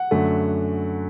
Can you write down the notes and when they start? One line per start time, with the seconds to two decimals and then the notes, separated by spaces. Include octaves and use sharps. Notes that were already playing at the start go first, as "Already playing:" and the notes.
Already playing: F#5
0.11 F#2 D3 A3